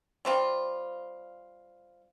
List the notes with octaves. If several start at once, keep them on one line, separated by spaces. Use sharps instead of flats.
G3 C4 F4